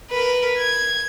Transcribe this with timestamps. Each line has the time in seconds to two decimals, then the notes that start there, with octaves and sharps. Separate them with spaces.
0.11 A#4 B4
0.57 G#6